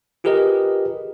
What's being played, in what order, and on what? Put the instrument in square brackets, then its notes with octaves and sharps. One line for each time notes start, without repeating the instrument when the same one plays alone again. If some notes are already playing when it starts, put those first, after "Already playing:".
[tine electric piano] F4 G4 G#4 A#4 B4 D#5